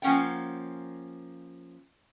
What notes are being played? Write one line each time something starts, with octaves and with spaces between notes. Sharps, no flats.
F3 A#3 C#4 F#5 G5